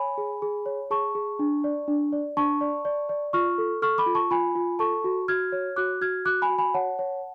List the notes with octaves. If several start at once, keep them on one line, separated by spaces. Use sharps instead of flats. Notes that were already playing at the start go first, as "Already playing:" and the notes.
Already playing: C#5 G#5 B5
G#4
G#4
C#5
G#4 A5 C#6
G#4
D4
D5
D4
D5
D4 A5 C#6
D5
D5
D5
F4 C#6 F6
A4
A4 C#6 F6
B5 D6
F4
A5 C#6
F4 G#5 B5
F4
A4 A5 C#6
F#4
F#4 F6 G#6
C#5
F#4 D6 F#6
F#4 F6 G#6
F#4 D6 F#6
G#5 B5
F#4
G#5 B5
C#5 F#5 A5
C#5